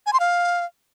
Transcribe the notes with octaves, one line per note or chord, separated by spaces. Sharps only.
G#5
C6
F5